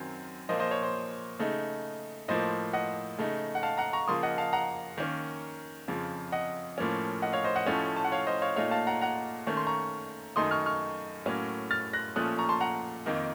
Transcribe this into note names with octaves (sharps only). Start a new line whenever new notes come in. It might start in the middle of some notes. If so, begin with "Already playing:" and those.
Already playing: F#2 D#3 F#3 C4
A#2 F3 A#3 C5 D#5
C5 D#5
C#5
C5
C#3 A3 D#4
A2 F3 A#3 C5 D#5
D#5 F#5
C#3 A3 D#4
F#5
F5 A5
F#5 A#5
A#5 C#6
C#3 F3 A#3 C6 D#6
D#5 F#5
F5 A5
F#5 A#5
D#3 A#3 C#4
F2 C#3 F3
D#5 F#5
A2 F3 A#3 C#4
D#5 F#5
C#5 F5
C5 D#5
D#5 F#5
A2 F3 A3 C#4
A5
F#5
C#5 F5
C5 D#5
C#5 F5
A#2 A3 D#4 C#5 F5
F5 A5
F#5 A#5
F#5 A#5
D#3 A3 C#4 C#6
C6
A#5 C#6
F#2 D#3 A3 D#4 C6 D#6
C#6 F6
C#6 F6
A2 F#3 A#3 C#4
F6 A6
F#6 A#6
A#2 F3 A3 C#4 D#6 F#6
A#5 C#6
A5 C6
F#5 A#5
F2 D#3 A#3 D#4